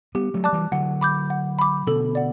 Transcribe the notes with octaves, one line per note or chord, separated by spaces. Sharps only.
G3 B3 G4
F#3 A3
D5 A5 D6 F#6
E3 G3
D3 F#3 F#5
B5 D6 G6
F#5
B5 D6
B2 D3 A4
D5 F#5